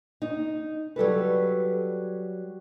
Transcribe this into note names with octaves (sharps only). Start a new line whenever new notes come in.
D#4
F#3 G3 A4 B4